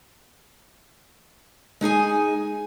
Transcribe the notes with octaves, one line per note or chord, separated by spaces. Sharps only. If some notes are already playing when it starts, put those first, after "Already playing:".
G#3 D#4 G#4 G#5